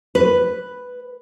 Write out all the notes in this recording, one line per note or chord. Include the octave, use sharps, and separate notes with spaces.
B4